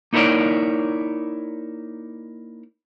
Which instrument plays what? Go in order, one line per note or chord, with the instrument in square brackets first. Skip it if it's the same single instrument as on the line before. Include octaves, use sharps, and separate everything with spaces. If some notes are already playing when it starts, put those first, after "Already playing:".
[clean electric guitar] A#3 D#4 E4 A#4 C#5 D5